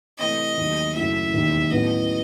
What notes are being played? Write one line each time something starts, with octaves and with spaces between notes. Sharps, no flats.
C3 E3 A3 D#5
D#2 D#3 F#3 A3 D#4
F#1 F#2 F#3 A3 E4 E5
E1 D#2 D#3
A1 A2 F#3 B3 D#5